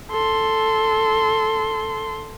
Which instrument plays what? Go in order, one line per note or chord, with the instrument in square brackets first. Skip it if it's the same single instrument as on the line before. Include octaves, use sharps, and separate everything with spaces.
[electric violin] A4 C6